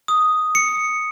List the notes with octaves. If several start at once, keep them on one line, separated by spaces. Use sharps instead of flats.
D#6
C#7